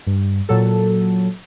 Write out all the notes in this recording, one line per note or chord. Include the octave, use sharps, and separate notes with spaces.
G2
A#2 F#3 A4